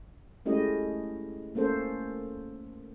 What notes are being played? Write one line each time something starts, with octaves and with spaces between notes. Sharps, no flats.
G#3 A3 C#4 E4 G4 D#5
A3 A#3 C#4 A4 C5